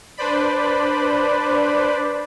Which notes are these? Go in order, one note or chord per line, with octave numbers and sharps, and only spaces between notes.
D4 B4 C5 D5 B5